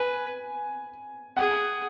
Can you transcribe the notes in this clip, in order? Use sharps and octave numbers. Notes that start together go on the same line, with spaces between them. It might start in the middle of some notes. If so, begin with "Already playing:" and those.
Already playing: B4 G#5
G#4 F#5